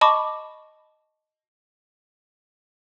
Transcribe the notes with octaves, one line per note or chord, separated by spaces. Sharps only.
D#5 A5 B5 C#6 D6